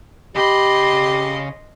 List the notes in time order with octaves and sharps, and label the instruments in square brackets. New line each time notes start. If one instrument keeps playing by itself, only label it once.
[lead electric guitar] C#3 B5 [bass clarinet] G4 [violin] D#5 C6